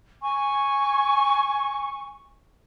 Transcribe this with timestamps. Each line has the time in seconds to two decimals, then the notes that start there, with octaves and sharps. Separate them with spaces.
0.22 G#5 C#6